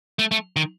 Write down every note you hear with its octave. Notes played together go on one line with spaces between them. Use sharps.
A3
A3
D#3